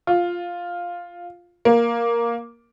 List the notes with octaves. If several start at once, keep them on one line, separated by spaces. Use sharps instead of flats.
F4
A#3